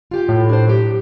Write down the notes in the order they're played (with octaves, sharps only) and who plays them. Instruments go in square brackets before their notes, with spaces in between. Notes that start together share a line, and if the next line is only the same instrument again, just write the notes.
[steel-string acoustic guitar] F4 G4 G5
[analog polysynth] A2
[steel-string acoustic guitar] D4 C5
F#3 G4